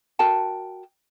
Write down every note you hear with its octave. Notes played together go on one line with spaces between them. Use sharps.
F#4 A#4 G5 A5